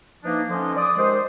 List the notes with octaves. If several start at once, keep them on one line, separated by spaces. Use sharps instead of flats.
E3 F3 A#3 D4 D#4
D3 F3 C#4 D5 D#5 C6
D5 D6 D#6
D#3 G#3 G4 C5